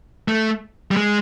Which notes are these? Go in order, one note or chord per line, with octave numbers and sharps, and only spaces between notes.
A3
G3
G#3